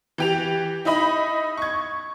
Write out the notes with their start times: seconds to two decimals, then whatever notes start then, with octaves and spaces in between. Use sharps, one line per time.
0.18 E3 G4 F7
0.85 D#4 E4 D#5 B5
1.57 C#6 G#6